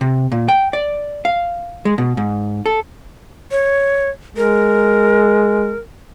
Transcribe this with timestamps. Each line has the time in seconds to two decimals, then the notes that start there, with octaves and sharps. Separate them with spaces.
0.01 C3
0.32 A#2
0.49 G5
0.73 D5
1.25 F5
1.85 G#3
1.98 B2
2.17 G#2
2.66 A4
3.51 C#5
4.37 G#3 A#4